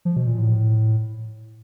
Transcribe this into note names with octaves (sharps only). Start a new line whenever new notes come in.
F3
B2
A#2
A2